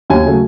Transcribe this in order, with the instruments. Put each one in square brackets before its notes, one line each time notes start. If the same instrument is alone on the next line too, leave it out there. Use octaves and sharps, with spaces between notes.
[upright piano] D#2 [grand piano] G#5
[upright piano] C#3 F#3 A3